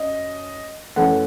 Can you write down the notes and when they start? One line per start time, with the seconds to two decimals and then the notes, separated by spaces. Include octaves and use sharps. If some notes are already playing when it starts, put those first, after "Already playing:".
Already playing: F#2 D#5
0.96 F#2 E3 A3 F#5